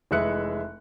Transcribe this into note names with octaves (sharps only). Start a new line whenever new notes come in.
F1 E3 G#3 E5 F#6 C#7